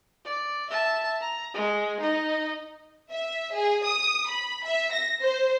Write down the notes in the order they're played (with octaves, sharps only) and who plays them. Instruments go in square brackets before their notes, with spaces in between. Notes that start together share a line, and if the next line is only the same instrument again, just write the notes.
[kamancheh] D5
E5 A5
A#5
G#3
D#4 D#5
[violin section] E5
G#4
D#6
B5
E5
A#6
C5